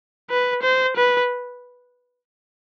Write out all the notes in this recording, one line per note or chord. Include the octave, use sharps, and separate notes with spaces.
B4
C5
B4